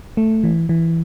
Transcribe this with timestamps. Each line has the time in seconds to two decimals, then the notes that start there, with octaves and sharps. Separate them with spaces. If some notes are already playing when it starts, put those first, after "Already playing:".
0.17 A3
0.44 E3
0.69 E3